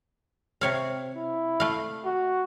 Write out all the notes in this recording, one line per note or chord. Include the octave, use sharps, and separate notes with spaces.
C3 C#5 F5
E4
A3 F5
F#4